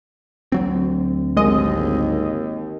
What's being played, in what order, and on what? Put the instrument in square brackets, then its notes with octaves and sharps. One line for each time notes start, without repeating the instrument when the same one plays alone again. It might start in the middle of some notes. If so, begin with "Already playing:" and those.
[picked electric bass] D2 F#3 C4
[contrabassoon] G#1 [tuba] D#2 [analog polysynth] G#3 D#5